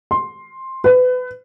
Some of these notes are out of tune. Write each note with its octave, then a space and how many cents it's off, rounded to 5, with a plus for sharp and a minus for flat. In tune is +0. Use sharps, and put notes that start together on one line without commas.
C6 +10
B4 +30